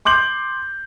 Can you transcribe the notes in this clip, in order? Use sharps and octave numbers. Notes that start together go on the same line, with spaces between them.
C6 D6 G6 F#7